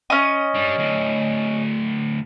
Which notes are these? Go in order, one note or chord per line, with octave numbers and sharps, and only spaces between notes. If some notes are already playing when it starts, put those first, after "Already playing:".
C#4 D#5
G3 D4
D2 A2